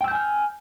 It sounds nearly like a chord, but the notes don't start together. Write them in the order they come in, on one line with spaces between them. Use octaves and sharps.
G5 E6 G6 G#5 F6